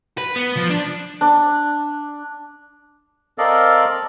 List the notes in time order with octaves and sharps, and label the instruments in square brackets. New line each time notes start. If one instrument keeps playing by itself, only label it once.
[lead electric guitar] B4
B3
F3
D4
[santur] D4
[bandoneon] C4 A4 A#4 D5 D#5 F5